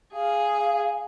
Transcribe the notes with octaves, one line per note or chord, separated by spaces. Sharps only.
G#4 F5